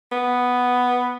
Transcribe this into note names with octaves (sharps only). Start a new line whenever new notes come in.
B3